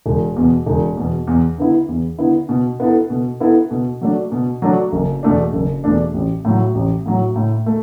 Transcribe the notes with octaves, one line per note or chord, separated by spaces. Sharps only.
E1
E2 B2
E1
E2 B2
E2
D3 B3 E4
E2
D3 B3 E4
B2
B3 E4 A4
B2
B3 E4 A4
B2
F#3 A3 D4
B2
F#3 A3 D4
F#1
E2 B2 A3 D4
F#1
E2 B2 A3 D4
A1
A2 F#3
A1
A2 F#3
A2
A3